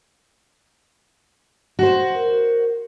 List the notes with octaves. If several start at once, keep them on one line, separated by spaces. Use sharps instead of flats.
F#4 C5
A#4